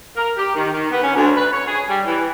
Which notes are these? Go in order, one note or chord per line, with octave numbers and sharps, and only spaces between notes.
A#4
G4
D#3
D#3
B3
C#4
D2
B4
C#5
G#4
G3
E3